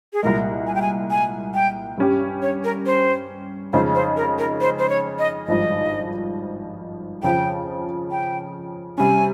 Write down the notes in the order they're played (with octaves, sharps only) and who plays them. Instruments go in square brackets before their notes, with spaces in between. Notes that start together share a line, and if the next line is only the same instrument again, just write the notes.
[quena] G#4
[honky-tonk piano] C2 A#2 G#3 [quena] A#4
[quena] G#5
G5
G#5
G#5
G5
[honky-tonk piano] G2 G3 C#4 G4
[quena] C#5
A#4
C5
[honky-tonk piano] F2 C#3 G#3 D#4 G#4 [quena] C5
[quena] C5
A#4
A#4
C5
C5
C#5
D#5
[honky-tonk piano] G#1 G2 F3 G#3 D#4 [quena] D#5
[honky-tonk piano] F2 C#3 F3 [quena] G5
[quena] G5
[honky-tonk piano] C3 G3 C#4 [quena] G#5